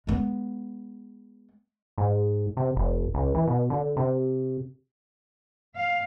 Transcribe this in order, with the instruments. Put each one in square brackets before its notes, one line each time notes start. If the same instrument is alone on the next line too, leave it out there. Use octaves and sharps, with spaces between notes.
[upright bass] G#3 B3
[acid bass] G#2
C3
F1
C#2
E3
B2
D3
C3
[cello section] F5